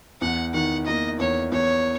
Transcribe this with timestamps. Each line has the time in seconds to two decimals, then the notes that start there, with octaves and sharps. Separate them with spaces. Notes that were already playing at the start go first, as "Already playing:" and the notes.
0.21 E2 F#5
0.54 D#3 F#5
0.86 A#3 D#5
1.19 E2 C#5
1.52 E2 C#5